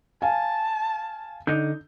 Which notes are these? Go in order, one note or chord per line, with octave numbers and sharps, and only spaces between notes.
F5 G#5 A5
D3 D#4 G6